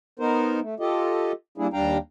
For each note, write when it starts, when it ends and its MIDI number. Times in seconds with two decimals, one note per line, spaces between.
0.19 0.60 59
0.19 0.60 63
0.19 0.60 70
0.19 0.60 72
0.61 0.75 57
0.80 1.32 65
0.80 1.32 67
0.80 1.32 69
0.80 1.32 75
1.58 1.67 55
1.58 1.67 58
1.58 1.67 62
1.58 1.67 64
1.58 1.67 68
1.73 1.98 39
1.73 1.98 55
1.73 1.98 62
1.73 1.98 77
1.73 1.98 79
1.73 1.98 82